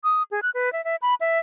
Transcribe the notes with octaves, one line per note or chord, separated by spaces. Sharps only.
D#6
G#4
F#6
B4
E5
E5
B5
E5